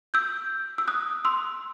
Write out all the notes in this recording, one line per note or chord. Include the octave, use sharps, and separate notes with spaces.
E6 G6
E6
D#6 F#6
C6 E6